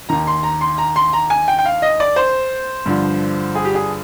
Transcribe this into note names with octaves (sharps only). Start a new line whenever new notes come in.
D#2 D#3 A#5
C6
A#5
C6
A#5
C6
A#5
G#5
G5
G5
F5
D#5
D5
C5
G2 D3 F3
G#4
G4
G#4